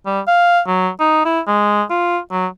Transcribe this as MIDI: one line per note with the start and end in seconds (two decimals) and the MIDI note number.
0.06 0.20 55
0.27 0.60 77
0.67 0.89 54
1.00 1.24 63
1.25 1.40 64
1.47 1.83 56
1.90 2.18 65
2.31 2.47 54